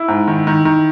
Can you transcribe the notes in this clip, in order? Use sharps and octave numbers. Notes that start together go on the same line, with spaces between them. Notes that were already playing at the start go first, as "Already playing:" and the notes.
Already playing: E4
G#2
D#3
D#3
D#3